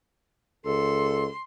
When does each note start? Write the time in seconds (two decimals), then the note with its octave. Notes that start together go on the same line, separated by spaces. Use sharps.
0.65 C#2 A4 C6